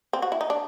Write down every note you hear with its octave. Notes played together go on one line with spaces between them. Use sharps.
C4
F#4
E4
D#4
D4